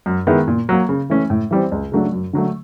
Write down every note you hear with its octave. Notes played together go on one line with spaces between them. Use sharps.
F#2
D#3 G#3 B3 E4
A#2
F#3 A#3
C#3
E3 A3 C#4
A2
E3 G3 C4
C#2
C#3 F#3 A3 D4
F#2
D3 F#3 A3